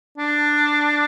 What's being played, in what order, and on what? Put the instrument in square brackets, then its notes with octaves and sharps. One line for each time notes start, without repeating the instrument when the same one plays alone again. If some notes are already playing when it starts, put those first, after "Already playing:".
[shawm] D4